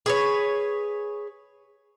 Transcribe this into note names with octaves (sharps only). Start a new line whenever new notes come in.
G#4 B4 C#5